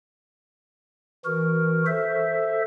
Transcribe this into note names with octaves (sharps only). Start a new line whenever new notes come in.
E3 F#4 A#4
A4 C5 E5